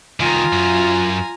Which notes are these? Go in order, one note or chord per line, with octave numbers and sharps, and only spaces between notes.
C2 D#3 F4 G#5 A#5
F#2